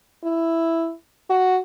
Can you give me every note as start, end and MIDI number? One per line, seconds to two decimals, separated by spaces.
0.24 0.93 64
1.30 1.60 66